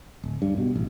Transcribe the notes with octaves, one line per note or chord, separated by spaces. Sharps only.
D1
G2
B2
A1